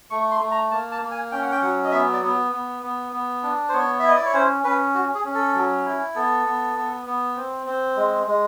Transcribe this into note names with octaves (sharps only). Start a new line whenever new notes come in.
A3 C#6
C6
A3
A#5
A#3 A5
A5
A#3
G#5
C#4 G5
F#5
G5
F#3 F#5
D#5
B3 E5
D5
B3
B3
B3
B3
D4
C5
B3 C#5
E5
E4 D#5
D5
C#5
C#4 C5
C#4 B4
F#4
G#4
C#4
A4
F#3
E4
B3 A4
B3
B3
B3
C4
C4
G#3
G#3